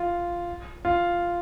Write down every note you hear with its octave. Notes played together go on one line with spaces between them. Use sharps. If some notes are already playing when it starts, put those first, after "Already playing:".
Already playing: F4
F4